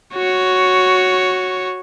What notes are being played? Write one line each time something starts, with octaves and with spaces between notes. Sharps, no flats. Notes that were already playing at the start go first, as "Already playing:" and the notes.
F#4 C#5